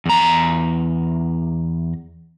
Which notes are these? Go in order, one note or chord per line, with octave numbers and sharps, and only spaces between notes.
E2 A#5